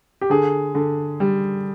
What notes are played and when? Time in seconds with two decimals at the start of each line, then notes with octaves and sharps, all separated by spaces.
0.21 G4
0.30 D3 G#4
0.75 D3
1.20 G3